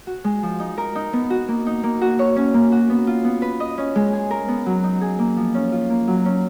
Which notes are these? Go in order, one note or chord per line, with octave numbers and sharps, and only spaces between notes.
F#4
G#3
F3
D#4
A#4
D#4
B3
F#4
A#3
D#4
A#3
F#4
C#5
C#4
A#3
F#4
B3
F4
B3
B4
D#5
C#4
G#3
G#4
A#4
B3
F#3
D#4
G#4
A#3
F3
C#4
F4
A#3
F#3
C#4